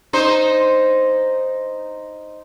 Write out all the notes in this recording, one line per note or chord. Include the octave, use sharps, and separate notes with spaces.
D#4 C5